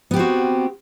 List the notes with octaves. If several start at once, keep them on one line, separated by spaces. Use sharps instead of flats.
B3 C4 F#4 G4